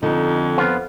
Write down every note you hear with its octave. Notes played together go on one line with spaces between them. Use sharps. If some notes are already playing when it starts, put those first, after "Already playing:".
F2 D3 D#4
F3 B3 F4